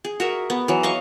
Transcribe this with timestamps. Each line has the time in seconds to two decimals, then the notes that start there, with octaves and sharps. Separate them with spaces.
0.05 G#4
0.20 F#4 A#4 E5
0.50 B3
0.68 E3 F#3
0.83 D#5 F5 C#6